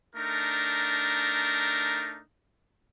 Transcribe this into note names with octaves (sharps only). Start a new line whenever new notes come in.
A3 D4 D#4 A#4